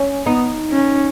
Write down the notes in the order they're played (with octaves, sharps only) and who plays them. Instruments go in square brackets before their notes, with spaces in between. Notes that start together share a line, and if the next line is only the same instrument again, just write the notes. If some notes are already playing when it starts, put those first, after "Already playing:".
Already playing: [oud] C#4
[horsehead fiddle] B3 [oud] D#4
[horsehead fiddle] C#4